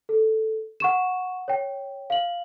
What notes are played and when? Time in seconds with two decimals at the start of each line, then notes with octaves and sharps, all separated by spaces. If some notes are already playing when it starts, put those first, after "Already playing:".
0.09 A4
0.80 F#5 C#6 E7
1.48 C#5 G5
2.10 F5 F#7